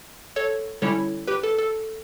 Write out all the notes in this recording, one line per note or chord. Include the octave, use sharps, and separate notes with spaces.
A4 C#5
D3 G3 C#4 E4 A4 C#5
G4 B4
A4
A4